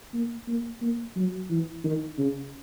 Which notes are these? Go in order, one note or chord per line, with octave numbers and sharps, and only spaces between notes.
A#3
A#3
A#3
F#3
E3
D#3
C#3